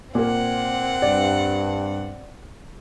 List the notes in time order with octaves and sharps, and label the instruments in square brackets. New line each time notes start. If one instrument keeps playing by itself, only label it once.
[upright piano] A#2 A#3 [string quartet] C4 F#5
[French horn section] G2 [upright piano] D5